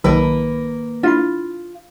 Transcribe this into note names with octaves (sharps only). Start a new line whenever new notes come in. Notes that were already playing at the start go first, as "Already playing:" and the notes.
B1 D#3 F#3 A#3 A#4 B4 A5
D4 E4 F4 B5